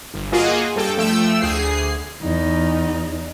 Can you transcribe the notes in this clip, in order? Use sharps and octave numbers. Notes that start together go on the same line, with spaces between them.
G1
A#3 F4 F#4 G#4 D#5
G2 A4 G5
F3 A3 G5 E6
D2 G#4 C7
E2 D#4